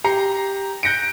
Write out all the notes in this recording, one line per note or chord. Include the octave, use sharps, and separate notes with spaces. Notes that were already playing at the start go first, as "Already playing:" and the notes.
G4 A#5 C7
F#6 G6 A#6 C#7 D7